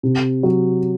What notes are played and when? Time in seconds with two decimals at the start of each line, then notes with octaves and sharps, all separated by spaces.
0.03 C3
0.43 F#3